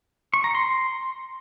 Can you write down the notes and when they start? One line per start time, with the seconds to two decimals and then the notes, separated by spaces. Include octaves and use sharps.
0.34 C#6
0.44 A#5
0.55 C6